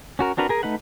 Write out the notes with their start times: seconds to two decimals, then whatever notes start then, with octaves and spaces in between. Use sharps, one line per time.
0.19 C#4 F#4 A#4
0.37 C4 D4 F#4 A#4 B4
0.49 G#4 A#4 G#5
0.63 A3 D#4 B4 F#5